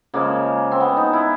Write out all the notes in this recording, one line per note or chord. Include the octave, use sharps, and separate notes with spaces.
C#3 F3 G#3 A#3
C4
B3
D#4
E4